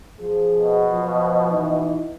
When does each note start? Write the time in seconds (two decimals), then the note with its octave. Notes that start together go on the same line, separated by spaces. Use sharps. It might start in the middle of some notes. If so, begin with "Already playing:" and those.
0.20 F3 G#4
0.59 B2
0.93 F3
1.51 E3 D#4